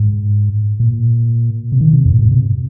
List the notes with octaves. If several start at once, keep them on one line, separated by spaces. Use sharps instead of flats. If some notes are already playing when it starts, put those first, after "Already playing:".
Already playing: G#2
A#2
C3
D#3
C3
F2
A#2
G#2
C3